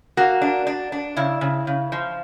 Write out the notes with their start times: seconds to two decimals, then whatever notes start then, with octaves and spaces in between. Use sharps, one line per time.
0.17 A#3 F#4
0.42 D4
0.67 D4
0.92 D4
1.17 C#3 E4
1.41 C#3
1.67 C#3
1.92 F3